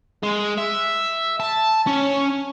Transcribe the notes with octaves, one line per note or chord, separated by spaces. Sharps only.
G#3
E5
A5
C#4